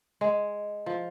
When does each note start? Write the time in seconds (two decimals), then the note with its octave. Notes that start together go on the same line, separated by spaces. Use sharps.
0.21 G#3
0.86 F3